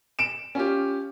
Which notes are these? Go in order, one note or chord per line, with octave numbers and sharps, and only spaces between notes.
D7 E7
C#4 F4 G4